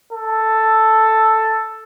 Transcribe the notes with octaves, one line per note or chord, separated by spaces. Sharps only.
A4